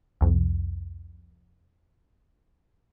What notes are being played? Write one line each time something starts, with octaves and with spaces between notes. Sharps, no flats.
C2 F2